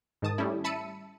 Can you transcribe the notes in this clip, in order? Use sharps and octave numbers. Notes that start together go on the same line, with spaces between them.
G#2 D#3 A5 D#6
G3 A3 C#4 E4
E5 A5 B5 E6 C#7 D#7